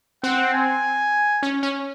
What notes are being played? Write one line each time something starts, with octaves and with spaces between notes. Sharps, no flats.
C4 F#5
G#5
C#4
C#4